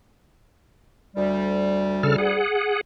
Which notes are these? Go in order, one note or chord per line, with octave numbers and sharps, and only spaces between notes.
D2 G3
C#3 A4 F6
G#4 F#5